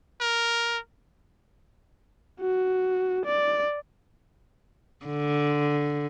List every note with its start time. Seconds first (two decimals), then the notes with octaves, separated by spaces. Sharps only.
0.21 A#4
2.40 F#4
3.26 D5
5.06 D3